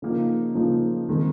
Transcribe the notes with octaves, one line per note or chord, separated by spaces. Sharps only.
C#3 F3 A#3 D#4
C#3 F3 A#3 D#4
D#3 G#3 C4